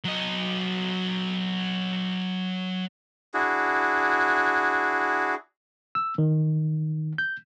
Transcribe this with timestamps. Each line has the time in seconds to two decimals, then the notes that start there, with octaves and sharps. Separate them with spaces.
0.04 F#3 D#5
3.34 D4 E4 F#4 G#4
5.95 E6
6.18 D#3
7.18 G6